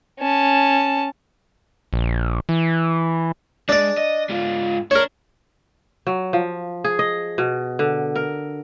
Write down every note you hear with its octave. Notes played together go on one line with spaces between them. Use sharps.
C#4 A5
A#1
E3
G#3 D4 D5
D#5
G#2 F4
D4 A#4 C#5
F#3
F3
G#4
D#5
B2
D3
A#4